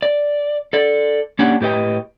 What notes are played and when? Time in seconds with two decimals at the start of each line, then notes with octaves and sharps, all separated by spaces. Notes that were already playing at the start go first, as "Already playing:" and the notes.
0.02 D5
0.73 A4 D5
1.39 A#3 C#4 D4 G4 F#5
1.61 A2 G4 B4 D#5 G5